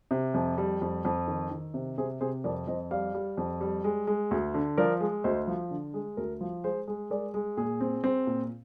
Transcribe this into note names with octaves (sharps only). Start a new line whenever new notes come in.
C3
F2
G3
F2
F2
D#3
D#3
C3
C3 G#4 C5
C3 G#4 C5
F2 A#4 D5
F2 C5 D#5
G3 D5 F5
G3
F2
G3
G#3
G#3
D2
D3
F3 A#4 D5
G#3
D2 C5 D#5
F3
D3
G#3
D2 A#4
F3
G#3 G#4 C5
G#3
G#3 A#4 D5
G#3
A#2 G#4
C4
C4
A#2